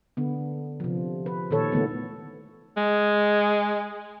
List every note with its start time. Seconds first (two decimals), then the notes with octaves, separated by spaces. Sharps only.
0.17 D3 B3
0.80 C3 F3
1.26 B4
1.51 A#2 D#3 A4 C#5
1.72 D3 E3 A3 B3
2.77 G#3